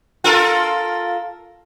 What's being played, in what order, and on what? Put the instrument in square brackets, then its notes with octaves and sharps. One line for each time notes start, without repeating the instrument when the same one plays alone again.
[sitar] F4 A4 A#4